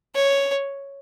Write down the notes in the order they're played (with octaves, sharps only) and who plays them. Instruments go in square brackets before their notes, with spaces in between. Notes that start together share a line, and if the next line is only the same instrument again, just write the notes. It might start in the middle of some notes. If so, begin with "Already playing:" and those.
[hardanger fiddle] C#5